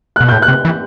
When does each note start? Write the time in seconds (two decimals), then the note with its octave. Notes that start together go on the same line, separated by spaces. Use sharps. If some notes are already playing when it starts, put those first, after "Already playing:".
0.16 B2 F#6
0.29 A2 G6
0.42 F#6
0.48 C3
0.65 E3